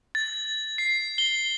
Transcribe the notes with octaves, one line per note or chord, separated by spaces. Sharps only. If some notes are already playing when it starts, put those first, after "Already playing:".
A6
C7
G7